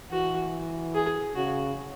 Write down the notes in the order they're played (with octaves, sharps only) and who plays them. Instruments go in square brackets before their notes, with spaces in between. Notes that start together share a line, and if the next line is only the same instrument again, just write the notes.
[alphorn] E3 [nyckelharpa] F#4
[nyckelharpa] G#4
[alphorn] C#3 [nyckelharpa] F#4